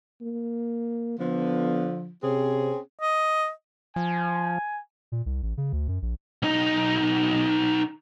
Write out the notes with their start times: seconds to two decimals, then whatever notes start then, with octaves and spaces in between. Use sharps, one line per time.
0.22 A#3
1.20 D3 F3 B3
2.23 C3 C4 C#4 G#4
3.00 D#5
3.96 F3 G#5
5.12 A#2
5.26 C2
5.43 A1
5.57 C#3
5.73 D2
5.88 F#2
6.02 A#1
6.43 B1 D#4